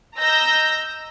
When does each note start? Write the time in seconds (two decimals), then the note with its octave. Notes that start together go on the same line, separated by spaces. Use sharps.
0.17 D#5 A#5 E6 G6 A#6